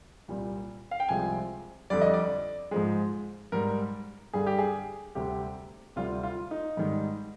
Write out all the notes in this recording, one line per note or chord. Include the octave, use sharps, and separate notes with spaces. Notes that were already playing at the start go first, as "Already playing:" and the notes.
C2 A#2 G3
F5
G5
C2 C3 F3 G#3 G#5
F2 D3 G3 D5
D#5
D5
G#2 F3 G#3
G#2 G3 A#4
G2 D3 G3 G#4
G4
G#4
D2 C3 G3 G4
D2 C3 G3 F4
F4
D#4
G#2 D#3 G3